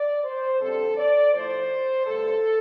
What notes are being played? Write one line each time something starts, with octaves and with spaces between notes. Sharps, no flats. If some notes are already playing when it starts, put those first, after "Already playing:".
Already playing: D5
C5
F2 D3 G3 C4 A4
D5
A2 F3 A3 C5
G2 D3 A3 A4